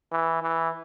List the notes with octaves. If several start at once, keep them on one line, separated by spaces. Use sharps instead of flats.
E3
E3